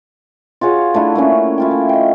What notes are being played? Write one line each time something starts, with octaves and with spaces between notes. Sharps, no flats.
F4 F#4 G#4 C#5
A3 D4 E4 A4
A3 A#3 C#4
E4 F4 G5
A3
D#5 G5